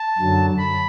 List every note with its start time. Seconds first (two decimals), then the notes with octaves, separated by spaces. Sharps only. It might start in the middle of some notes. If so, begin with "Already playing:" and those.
Already playing: A5
0.19 F#2 D3 F#3
0.58 B5